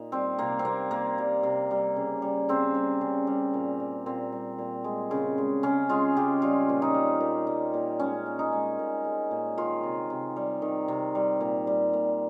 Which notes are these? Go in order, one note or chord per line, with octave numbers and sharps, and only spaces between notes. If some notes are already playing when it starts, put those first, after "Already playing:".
Already playing: A#2 D#4
G3 C4
C3 A#3
C4
G3 A#3
C3 A#3
G3
C3
G3
C#3
G3
C#3 C4
G3
C#3
G3
A#2
G3
A#2 C4
G3
A#2
G#3
C#3
G#3
C#3 C#4
G#3 F4
C#3 G4
G3 F4
A#2
D#4
G3
A#2
G3
A#2
G#3 C#4
A#2
D#4
G#3
A#2
G#3
A#2
D#3 F4
C3
C3
G3
D#3
C3
G3
A#2
G3
A#2